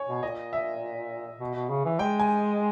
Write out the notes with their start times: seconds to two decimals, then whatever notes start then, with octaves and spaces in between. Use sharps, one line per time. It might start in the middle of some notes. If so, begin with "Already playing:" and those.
Already playing: C#5 G#5
0.08 B2
0.23 A#2 D#5
0.53 E5
1.40 B2
1.55 B2
1.70 C#3
1.85 E3
1.99 G#3 G5
2.20 G#5